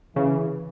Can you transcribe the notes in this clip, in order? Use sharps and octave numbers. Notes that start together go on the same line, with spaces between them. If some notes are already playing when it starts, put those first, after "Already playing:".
C#3 E3